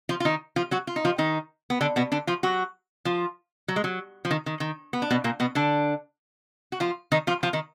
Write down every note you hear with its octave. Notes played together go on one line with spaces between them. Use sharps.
F3 F4
F4
D#3 D#4
F3 F4
F#3 F#4
F4
D#4
F3 F4
D#3 D#4
B3
D3 D4
B2 B3
D3 D4
F3 F4
F#3 F#4
F3 F4
F#3
G#3
F#3
F3
D#3
D#3
D#3
B3
D4
B2 B3
A#2 A#3
B2 B3
D3 D4
F#4
F3 F4
D#3 D#4
F3 F4
F3 F4
D#3 D#4